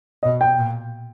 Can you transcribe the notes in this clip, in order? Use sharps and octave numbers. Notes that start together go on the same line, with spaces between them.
B2 D#5
G5
A#2